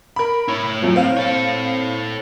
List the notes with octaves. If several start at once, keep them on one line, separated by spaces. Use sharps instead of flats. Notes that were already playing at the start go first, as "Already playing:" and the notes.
A#4 B5
E4 C#5
F#2 F3
C4 F5
A4 C#5